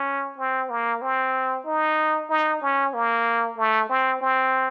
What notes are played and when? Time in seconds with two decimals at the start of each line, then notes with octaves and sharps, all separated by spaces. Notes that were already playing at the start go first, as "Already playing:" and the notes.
Already playing: C#4
0.38 C4
0.70 A#3
1.02 C4
1.66 D#4
2.29 D#4
2.62 C#4
2.94 A#3
3.57 A3
3.89 C4
4.21 C4